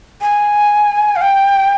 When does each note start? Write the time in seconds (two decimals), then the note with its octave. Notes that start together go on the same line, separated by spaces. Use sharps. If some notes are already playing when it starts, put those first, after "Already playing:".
0.21 G#5
1.16 F5
1.22 G5